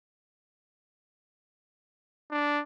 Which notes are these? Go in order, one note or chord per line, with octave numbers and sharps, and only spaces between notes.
D4